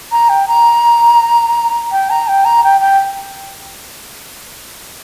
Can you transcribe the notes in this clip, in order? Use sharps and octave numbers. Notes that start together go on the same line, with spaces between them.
A#5
G5
A#5
G5
A#5
G5
A#5
G5
G5